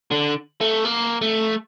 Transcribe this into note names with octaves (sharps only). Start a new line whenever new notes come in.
D3
A3
A#3
A3